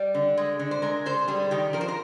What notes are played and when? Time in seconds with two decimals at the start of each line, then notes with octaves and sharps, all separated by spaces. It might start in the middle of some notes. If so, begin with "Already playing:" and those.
Already playing: G3 D5
0.14 D3
0.37 G#3
0.59 D3
0.71 C5
0.82 G#3 A#4
1.06 D3 C5
1.28 G3 G#4
1.51 D#3 G4
1.73 F3 A#4
1.81 C5
1.88 A#4